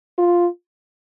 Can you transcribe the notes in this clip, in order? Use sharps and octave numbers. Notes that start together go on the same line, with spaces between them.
F4